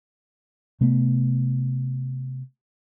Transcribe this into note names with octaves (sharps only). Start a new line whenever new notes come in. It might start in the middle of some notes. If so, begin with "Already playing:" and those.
C3 A3 B3